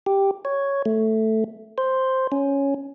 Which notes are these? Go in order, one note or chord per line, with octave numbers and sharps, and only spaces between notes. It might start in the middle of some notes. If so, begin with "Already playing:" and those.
G4
C#5
A3
C5
C#4